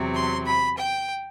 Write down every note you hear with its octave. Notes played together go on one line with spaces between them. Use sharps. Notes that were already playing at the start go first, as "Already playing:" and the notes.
Already playing: E2 C3 F#3 C4
C6
B5
G5